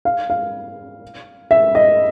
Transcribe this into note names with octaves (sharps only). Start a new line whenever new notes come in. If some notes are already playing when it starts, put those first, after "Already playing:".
F5
F5
E5
D#5